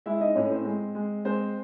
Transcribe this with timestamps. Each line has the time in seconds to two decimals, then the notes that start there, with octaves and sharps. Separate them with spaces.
0.06 G#3 E4 E5
0.21 D#4 D#5
0.35 A2 C#4 C#5
0.50 C4 C5
0.65 G#3
0.95 G#3
1.25 G#3 C4 C5